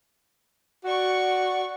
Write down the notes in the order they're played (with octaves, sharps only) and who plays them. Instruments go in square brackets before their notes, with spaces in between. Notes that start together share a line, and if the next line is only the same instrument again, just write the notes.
[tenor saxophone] F#4 [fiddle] D5 C#6